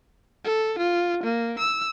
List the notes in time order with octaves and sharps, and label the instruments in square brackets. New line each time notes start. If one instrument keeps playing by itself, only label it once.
[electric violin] A4
F4
A#3
E6